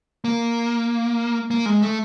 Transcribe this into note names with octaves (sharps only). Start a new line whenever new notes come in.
A#3
A#3
G#3
A3